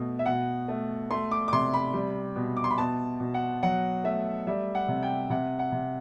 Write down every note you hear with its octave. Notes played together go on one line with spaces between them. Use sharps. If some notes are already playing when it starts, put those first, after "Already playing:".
Already playing: B2 A3
E5
B2 F#5
A3
A3 C6
D6
D6
C3 C6
B5
G3
B2
D6
C6
B5
B2 A5
B2
F#5
F#3 F#5
A3 E5
G3 E5
F#5
C3
G5
C3 F#5
F#5
C3